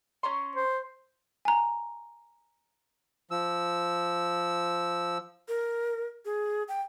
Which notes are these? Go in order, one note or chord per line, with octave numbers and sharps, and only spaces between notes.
C#4 A#5 C6
C5
G#5 A#5
F3 E6
A#4
G#4
G5